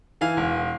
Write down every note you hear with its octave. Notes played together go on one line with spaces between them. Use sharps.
E3 F5 G#5
E1